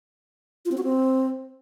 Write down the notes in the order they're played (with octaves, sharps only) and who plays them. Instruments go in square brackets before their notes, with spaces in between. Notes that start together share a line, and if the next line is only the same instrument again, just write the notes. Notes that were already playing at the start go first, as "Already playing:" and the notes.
[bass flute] F4
C4
F#4
C4